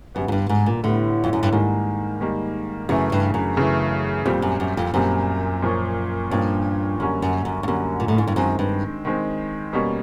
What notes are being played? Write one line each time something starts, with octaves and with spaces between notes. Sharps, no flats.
F#2 D3 G3 B3
G#2
G2
G#2
A#2
A2 D3 G3 B3
F2
F#2
G2
G#2 D#3 G3 A#3
D#3 G3 A#3
F#2 C#3 E3 A3
G2
F#2
C#3 E3 A3
F2 A#2 G3 C4
F#2
F#2
F2
F#2 A#2 G3 C4
A#2 F3 A#3 C#4
G2 A#2 F3 A#3 C#4
F#2 D3 G3 A#3 C#4
F#2
F#2
G2
F#2 D3 G3 A#3 C#4
A#2
A2
G#2
G2
F#2 D#3 G#3 C4
G2
D#3 G#3 C4
B2 G3 A#3 C#4